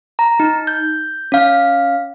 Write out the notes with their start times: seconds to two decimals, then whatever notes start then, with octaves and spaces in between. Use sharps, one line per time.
0.19 A#5
0.40 D#4
0.67 G6
1.32 C#4 F5